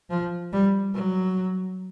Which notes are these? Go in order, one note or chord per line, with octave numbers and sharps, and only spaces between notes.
F3
G3
F#3